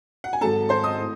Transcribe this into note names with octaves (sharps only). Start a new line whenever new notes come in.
F#5
G#5
G#1 G#2 F#3 A4 A5
C5 C6
D#5 D#6
A2